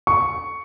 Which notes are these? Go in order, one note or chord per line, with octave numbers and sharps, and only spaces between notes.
C#6